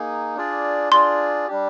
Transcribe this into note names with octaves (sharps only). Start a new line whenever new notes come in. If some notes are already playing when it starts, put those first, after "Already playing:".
Already playing: A#3 D#4 G#4
D4 F4 G#4 D5
D4 F4 G#4 D5 C6
G3 D4 G4